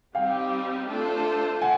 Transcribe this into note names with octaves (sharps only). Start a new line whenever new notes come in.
G3 C4 D#4 G4 F5 G5
A3 D4 F4 A4 C5
F#5 G#5